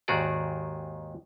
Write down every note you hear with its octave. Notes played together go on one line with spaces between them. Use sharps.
D#2 G#2 D#3 F#4 G#4 D5